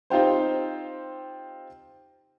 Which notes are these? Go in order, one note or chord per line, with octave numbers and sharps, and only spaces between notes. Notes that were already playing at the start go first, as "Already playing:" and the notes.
C4 D#4 F4 G4 C5